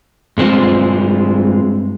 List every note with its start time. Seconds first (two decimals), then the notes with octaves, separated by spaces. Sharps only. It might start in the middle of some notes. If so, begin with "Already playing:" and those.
0.38 G2 G#3 C4 F4